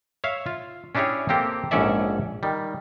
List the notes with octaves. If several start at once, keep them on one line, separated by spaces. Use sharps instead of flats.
C#5 E5 F5
F4
C#4 D4 E4 G4 G#4 C#5
A#3 C4 G4 A4
A#1 G#2 C#4 A4 D5 E5
D#3 G3